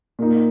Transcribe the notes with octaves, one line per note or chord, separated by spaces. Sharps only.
A#2 A#3 D#4